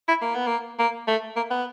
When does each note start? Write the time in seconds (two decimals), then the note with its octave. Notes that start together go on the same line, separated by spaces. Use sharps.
0.08 E4
0.22 A#3
0.35 B3
0.47 A#3
0.79 A#3
1.08 A3
1.36 A#3
1.50 B3